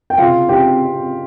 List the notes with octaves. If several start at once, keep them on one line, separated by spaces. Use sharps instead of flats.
G5
C#3 F4 F5
C#4 G4 G5